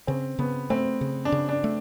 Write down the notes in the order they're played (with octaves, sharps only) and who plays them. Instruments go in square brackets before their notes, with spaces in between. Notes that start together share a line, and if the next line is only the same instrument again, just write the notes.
[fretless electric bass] C#3 [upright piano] C4
[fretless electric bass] C#3 [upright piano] B3
[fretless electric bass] A3 [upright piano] C4
[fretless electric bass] C#3
[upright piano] D4
[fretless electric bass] C#3
[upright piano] D4
[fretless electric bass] A3